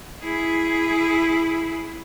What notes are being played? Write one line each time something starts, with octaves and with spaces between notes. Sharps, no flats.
E4 G#4